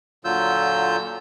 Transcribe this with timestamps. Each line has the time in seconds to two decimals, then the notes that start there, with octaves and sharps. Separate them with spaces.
0.25 A#2 D3 F#3 F4 E6 G6